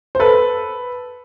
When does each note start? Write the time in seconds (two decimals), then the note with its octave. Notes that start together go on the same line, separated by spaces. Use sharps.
0.15 C5
0.20 A4 B4